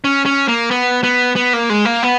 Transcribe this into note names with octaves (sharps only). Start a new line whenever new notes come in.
C#4
C#4
A#3
B3
B3
B3
A#3
G#3
A#3
B3